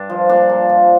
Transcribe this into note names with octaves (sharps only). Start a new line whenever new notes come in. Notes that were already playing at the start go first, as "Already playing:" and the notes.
Already playing: G2 D4
F3
A#2 D4
A#2
F3